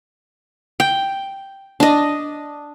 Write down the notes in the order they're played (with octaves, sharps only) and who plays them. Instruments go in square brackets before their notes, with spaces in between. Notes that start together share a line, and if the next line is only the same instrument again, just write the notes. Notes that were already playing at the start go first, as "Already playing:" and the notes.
[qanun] G5
D4 D#5